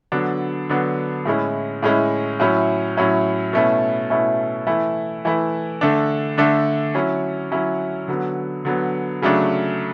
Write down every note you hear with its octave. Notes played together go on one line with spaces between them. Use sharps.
D3 F#3 B3 D4
D3 F#3 B3 D4
A2 G#3 C#4 E4
A2 G#3 C#4 E4
A2 F#3 C#4 E4
A2 F#3 C#4 E4
B2 A3 C#4 E4
B2 A3 C#4 E4
E3 A3 E4
E3 A3 E4
D3 A3 D4
D3 A3 D4
F#3 C#4 E4
F#3 C#4 E4
D3 F#3 B3
D3 F#3 B3
C#3 F#3 A3 D4